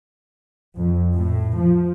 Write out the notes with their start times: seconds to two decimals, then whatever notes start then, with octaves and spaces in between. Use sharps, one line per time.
0.77 F2
1.15 A2
1.59 F3